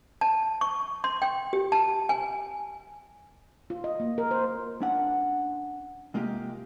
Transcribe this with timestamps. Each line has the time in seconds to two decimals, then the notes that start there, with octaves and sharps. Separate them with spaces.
0.21 A5
0.61 C#6
1.04 C6
1.22 G5
1.53 G4
1.72 A5
2.09 G#5
3.70 F4
3.84 D#5
4.00 A#3
4.18 A#4
4.31 C5
4.82 C#4 D4 F#5
6.14 C3 G#3 A#3 F4 G4